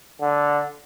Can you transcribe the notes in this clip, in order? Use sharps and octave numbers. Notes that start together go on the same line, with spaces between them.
D3